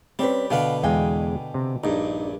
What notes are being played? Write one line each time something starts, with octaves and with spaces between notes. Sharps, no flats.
G3 C4 C#4 B4
B2 D3 B4 F5 G5
E2 G#3 F5 G5 G#5
C3
A#1 G2 D#4